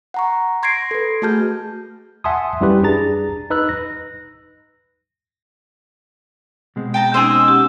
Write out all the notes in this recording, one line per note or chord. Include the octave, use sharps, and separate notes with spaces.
F#5 A#5 C#6
C6 G#6 A#6 C7 D7
A4 B4
A3 F#4 G#4 A5 F6 G6
E5 F#5 G#5 A5 C6 D#6
F#2 G3 E4 G4 B4
D4 G#4 A#5 A6
D#4 B4 E6 F#6
A#6
B2 G#3 C4
G5 A5 A#5
C#4 D#4 C5 D#5 G#5 E6
C#4 G4 F#5